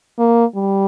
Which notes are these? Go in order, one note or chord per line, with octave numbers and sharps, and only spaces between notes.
A#3
G3